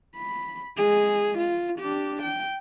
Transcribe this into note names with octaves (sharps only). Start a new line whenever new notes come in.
B5
G#3 G#4
F4
D4 G4
G5